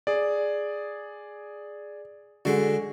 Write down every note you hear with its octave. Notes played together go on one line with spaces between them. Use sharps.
G#4 D5
D3 G#3 F#4